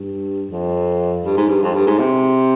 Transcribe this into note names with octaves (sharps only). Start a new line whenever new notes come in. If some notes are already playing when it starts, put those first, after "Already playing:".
Already playing: G2
F2
G2
G#2
G2
F2
G2
G#2
C3